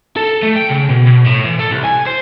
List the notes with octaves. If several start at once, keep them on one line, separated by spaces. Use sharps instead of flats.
A4
A3
G5
C#3
B2
B2
A2
E3
A4
C2
G#5
C5